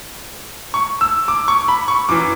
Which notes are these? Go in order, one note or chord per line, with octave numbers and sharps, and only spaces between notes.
C#6
E6
D6
C#6
B5
C#6
F#2 E3 D6